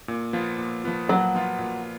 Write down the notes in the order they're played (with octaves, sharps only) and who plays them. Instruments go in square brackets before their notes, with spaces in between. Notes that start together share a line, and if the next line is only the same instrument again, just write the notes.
[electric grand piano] A#2
F3 B3 F4
A#2
F3 B3 F4
[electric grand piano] A#2 [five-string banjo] F#3
[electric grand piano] F3 B3 F4
A#2